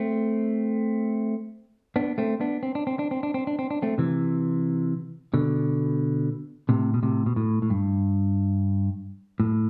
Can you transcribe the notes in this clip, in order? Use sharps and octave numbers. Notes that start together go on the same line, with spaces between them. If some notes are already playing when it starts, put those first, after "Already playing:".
Already playing: A3 C4
B3 D4
A3 C4
B3 D4
C4
D4
C4
D4
C4
D4
C4
D4
C4
D4
A3 C4
C3 E3
B2 D3
A2 C3
B2
A2 C3
B2
A2
A2
G2
A2